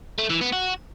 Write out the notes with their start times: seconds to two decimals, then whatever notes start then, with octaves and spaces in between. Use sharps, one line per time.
0.19 A3
0.30 E3
0.41 B3
0.52 F#4